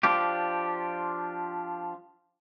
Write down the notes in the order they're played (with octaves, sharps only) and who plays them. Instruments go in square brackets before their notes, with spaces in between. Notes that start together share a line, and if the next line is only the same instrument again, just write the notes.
[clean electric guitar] F3 D4 F4 G4